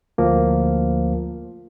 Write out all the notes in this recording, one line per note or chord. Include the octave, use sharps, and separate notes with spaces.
D2 F3 A#3